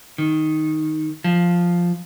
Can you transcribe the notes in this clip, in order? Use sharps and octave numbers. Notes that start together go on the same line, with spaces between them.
D#3
F3